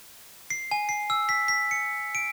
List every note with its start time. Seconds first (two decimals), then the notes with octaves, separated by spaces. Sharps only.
0.50 C7
0.71 G#5
0.89 C7
1.10 E6
1.29 B6
1.48 B6
1.71 C#7
2.15 D7